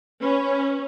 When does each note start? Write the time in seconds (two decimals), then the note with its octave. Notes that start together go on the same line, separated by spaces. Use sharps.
0.22 C#4 B4